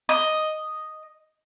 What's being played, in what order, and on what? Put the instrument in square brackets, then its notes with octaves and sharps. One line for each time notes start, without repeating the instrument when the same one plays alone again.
[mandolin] D#5